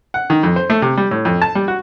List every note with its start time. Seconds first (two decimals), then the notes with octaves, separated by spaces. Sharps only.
0.14 F#5
0.30 D#3
0.43 F2
0.56 C5
0.70 A3
0.82 C3
0.97 G3
1.11 A2
1.25 F2
1.42 A5
1.55 G3
1.68 F#4